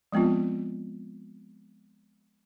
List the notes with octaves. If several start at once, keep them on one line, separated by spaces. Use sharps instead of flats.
F3 G#3 B3 C4 F4